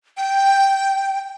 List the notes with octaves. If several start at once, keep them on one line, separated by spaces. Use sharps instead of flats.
G5